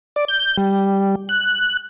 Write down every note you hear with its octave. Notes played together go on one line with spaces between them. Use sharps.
D5
G6
G3
F#6